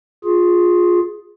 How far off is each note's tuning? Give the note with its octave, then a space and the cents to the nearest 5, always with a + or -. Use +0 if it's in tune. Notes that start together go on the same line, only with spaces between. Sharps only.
F4 +15 G#4 +0